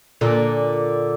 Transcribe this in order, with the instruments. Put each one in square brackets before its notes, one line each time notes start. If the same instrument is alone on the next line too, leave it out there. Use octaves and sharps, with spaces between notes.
[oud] A#2 D3